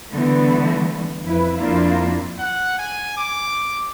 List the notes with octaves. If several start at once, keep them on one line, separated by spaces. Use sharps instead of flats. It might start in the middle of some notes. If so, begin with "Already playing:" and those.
D3 E3 G3 A3 B3
F2 E4 B4
F2 A#3 D4 E4 F4
F#5
G#5
D6